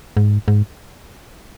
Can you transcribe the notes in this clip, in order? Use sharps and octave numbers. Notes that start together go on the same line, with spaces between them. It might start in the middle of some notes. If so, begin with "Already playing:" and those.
G#2
G#2